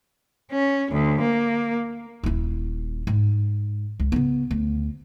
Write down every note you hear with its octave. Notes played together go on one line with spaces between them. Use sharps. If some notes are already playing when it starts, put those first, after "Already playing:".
C#4
D2
A#3
D#1 E4
G#2
C#2
C#3 B3
D2